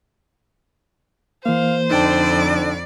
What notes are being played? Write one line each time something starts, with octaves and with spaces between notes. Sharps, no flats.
E3 A#3 C5 F5
F2 D3 D#4 D5 G5 A5